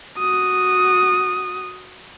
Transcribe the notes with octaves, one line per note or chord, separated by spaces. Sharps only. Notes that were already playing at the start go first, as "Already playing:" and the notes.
F#4 D#6